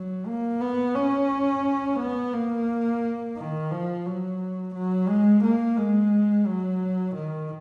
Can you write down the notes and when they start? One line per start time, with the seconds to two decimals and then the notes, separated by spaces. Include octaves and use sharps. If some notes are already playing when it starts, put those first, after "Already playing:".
Already playing: F#3
0.27 A#3
0.61 B3
0.96 C#4
1.99 B3
2.33 A#3
3.37 D#3
3.71 F3
4.06 F#3
4.74 F#3
5.08 G#3
5.43 A#3
5.77 G#3
6.47 F#3
7.15 D#3